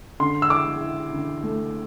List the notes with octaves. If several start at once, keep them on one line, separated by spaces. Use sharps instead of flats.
D3 C6
E6
E4 D6
E4
D3
A3